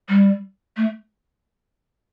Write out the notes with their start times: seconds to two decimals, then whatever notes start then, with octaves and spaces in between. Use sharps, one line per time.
0.09 G3
0.77 A3